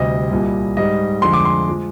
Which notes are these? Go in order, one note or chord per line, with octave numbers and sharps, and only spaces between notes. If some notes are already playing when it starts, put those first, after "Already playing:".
Already playing: D2 C3 G3 D#5
C2 A#2 G3
G#2 G3 D#5
F2 D3 F3 G#3 C6
D6
C6
F3 G#3